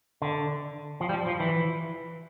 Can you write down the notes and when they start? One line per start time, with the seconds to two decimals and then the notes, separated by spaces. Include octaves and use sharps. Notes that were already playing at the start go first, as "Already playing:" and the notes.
0.22 D3
1.01 F3
1.09 G3
1.14 F3
1.27 F3
1.40 E3